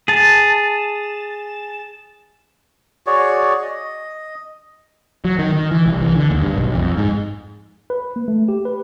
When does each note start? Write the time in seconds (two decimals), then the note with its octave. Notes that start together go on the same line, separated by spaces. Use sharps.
0.08 G#4 A5
3.07 F#4 G#4 C#5 D5
3.62 D#5
5.25 F#3
5.39 D#3
5.53 D#3
5.72 E3
5.86 C2
6.02 E3
6.16 D3
6.31 D#2
6.42 G2
6.57 B1
6.75 F2
6.97 G#2
7.90 B4
8.16 A#3
8.28 A3
8.48 G4
8.65 B4